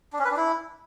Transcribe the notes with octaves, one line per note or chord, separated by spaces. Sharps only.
D4
C#4
B4
D4
E4